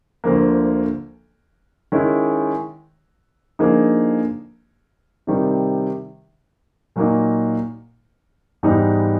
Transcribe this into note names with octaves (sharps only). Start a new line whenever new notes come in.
D2 D3 F3 A#3
D#3 G#3 C#4 E4
D3 F3 A#3 D#4 G#4
C3 D#3 G3
A#2 F#3 A#3 D#4
G#2 E3 G3 B3 D#4